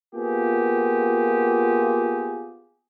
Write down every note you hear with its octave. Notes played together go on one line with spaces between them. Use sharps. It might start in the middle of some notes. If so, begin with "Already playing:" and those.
A#3 B3 F4 G4 G#4